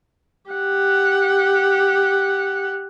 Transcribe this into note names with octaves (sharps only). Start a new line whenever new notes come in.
G4 F#5